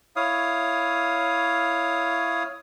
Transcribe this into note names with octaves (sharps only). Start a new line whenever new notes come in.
E4 C#5 F5 D#6